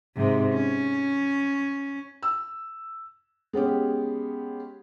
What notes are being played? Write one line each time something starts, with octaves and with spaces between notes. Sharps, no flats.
G#2 C3
C#4
E6
G#3 B3 C#4 G4